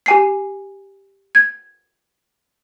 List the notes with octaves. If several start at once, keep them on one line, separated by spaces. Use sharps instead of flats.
G4 G#5 C7
G#6